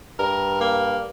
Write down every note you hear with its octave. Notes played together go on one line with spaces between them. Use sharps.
G2 A#4
A#3